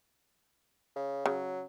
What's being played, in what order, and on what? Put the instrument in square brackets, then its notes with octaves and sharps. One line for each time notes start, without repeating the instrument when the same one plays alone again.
[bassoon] C#3
[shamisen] C#3 [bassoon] F#3